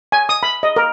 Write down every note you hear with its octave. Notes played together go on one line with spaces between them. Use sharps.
G#5
D#6
B5
D#5
A#4